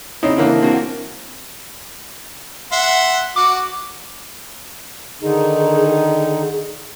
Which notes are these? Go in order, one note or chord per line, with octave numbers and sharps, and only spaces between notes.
C#3 C4 D#4 E4 C#5
D3 E3 A#3
D4
C4 F#4 A#4
E5 F#5 C6
F#4 D6
D3 D#3 D#4 G#4